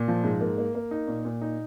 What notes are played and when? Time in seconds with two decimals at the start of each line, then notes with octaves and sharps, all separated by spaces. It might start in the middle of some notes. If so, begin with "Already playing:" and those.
Already playing: A#2
0.08 F3
0.24 G#2
0.41 A#3
0.58 A#3
0.75 A#3
0.91 D#4
1.08 A#2
1.25 A#2
1.41 D#4